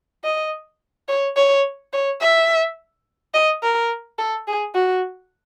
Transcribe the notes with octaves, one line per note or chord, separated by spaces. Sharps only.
D#5
C#5
C#5
C#5
E5
D#5
A#4
A4
G#4
F#4